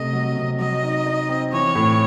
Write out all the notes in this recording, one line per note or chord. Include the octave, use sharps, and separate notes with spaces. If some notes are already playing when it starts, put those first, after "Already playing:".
Already playing: C3 A3 D#5
F#3
C3
F#3 D#5
D#4
D#4
C4
E3 C#5
A2